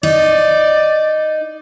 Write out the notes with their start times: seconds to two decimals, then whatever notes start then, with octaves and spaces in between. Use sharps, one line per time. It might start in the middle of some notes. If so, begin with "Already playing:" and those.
0.03 D#4 D5